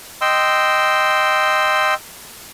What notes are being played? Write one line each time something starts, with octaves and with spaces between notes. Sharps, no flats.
D#5 G5 C6 E6